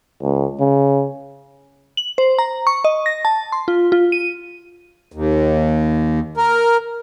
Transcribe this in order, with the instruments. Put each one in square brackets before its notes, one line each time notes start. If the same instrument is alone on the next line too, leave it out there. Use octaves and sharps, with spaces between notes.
[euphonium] C#2
C#3
[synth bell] F#7
C5
A#5
C#6
D#5
A#6
A5
C6
F4
F4
D#7
[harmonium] D#2
A#4